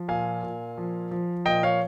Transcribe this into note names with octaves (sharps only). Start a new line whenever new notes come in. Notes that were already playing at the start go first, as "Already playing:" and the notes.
Already playing: F3
A#2 F5 G#5
A#2
F3
F3
A#2 D#5 G5
C#5 F5